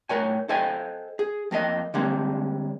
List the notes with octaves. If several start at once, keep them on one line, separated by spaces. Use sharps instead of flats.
A2 A#4 C#5 G#5
A4 C5 D#5 G5 G#5
G#4
F2 A#3 A4 D#5
D3 G3 G#3 A#3 C4 C#4